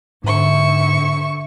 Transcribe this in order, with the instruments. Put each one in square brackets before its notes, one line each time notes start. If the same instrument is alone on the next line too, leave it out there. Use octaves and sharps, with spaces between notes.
[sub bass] G#2 [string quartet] D3 E5 C#6